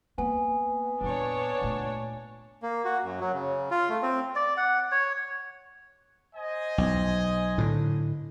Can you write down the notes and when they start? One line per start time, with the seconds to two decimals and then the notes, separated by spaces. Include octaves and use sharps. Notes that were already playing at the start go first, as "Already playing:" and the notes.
0.18 A#3 B3 G#5
1.01 F2 A#2 D4 C#5
1.62 A#2 A3
2.62 A#3
2.85 F#4
3.04 F#2
3.20 F#3
3.33 C#3
3.71 F4
3.89 A3
4.02 C4
4.36 D5
4.57 F#5
4.91 C#5
6.36 C5 D#5 G#5
6.78 B1
7.58 A2 D3